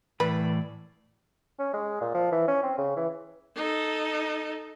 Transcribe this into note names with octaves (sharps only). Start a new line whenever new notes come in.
A2 E3 B4 D5
C#4
G#3
A#2
F3
E3
C#4
C4
C#3
E3
D#4 A4